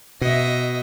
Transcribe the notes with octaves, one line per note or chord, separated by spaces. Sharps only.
B2 D#5 E5